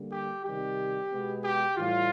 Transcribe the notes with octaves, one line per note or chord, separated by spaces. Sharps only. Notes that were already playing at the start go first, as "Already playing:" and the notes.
Already playing: D3 G3 A#3
G4
C3 D#3 G3 G4
B2 G#3 B3
G4
A2 E3 G3 F4